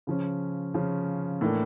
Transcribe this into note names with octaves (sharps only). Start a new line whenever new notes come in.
C#3 F3 C#4
C#3 F3 C#4
A2 E3 A#3 D4